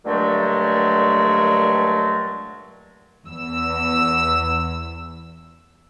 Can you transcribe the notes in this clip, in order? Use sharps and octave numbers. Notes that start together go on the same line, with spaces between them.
G2 A#2 D3 F#3 G#3 A3
E2 E6